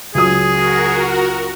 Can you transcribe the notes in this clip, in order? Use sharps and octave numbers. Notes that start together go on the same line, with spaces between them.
C#2 F#3 G#4 D#6
F#4 A#4